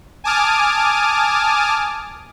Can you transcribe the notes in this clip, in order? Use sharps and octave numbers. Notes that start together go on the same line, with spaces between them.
G#5 A5 D6 D#6 F6